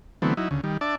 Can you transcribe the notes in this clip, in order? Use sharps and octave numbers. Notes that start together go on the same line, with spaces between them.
D3 E3 F#3 A3 B3 C4
F#3 D#4 E4
D2 C#3
D#3 G3
D4 D5 E5 A5